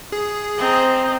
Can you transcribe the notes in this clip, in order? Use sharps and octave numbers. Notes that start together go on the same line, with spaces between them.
G#4
C4 D#5 A#5